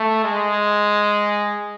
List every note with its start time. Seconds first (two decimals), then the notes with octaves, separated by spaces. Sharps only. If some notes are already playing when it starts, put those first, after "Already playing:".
Already playing: A3
0.24 G#3